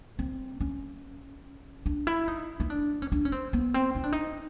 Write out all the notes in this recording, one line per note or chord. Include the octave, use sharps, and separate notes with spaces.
C4
C#4
D4
E4
D#4
D#4
D4
C#4
D4
C#4
C4
B3
C4
D#4
D4
D#4